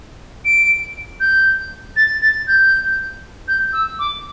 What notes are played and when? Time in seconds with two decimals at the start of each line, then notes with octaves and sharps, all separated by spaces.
0.45 D7
1.20 G6
1.96 A6
2.21 A6
2.47 G6
3.48 G6
3.73 E6
3.99 D6